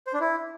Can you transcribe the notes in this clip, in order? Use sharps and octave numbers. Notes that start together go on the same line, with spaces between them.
C5
D4
E4